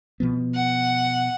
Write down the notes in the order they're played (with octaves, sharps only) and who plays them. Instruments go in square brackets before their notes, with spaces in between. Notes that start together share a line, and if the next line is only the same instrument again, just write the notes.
[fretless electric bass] B2 F3 B3
[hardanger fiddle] F#5